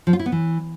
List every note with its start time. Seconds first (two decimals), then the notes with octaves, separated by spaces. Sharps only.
0.07 F3
0.13 F4
0.19 E4
0.26 B3
0.32 E3